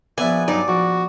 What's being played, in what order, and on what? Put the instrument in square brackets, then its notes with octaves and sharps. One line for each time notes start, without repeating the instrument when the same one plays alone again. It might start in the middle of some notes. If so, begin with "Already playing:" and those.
[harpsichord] A#1 E4 D5 [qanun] B3 G#5
[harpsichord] G2 F#3 [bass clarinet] D#4 [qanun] D5
[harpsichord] A#1 [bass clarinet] F#4